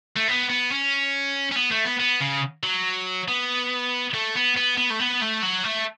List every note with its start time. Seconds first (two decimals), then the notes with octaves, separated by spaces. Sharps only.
0.16 A3
0.28 B3
0.49 B3
0.71 C#4
1.52 C#4
1.56 B3
1.72 A3
1.85 B3
2.00 B3
2.21 C#3
2.63 F#3
3.28 B3
4.14 A3
4.35 B3
4.57 B3
4.78 B3
4.91 A3
5.00 B3
5.22 A3
5.43 F#3
5.64 A3